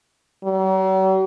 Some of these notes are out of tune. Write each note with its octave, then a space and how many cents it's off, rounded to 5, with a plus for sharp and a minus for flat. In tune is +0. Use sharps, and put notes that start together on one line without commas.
F#3 +45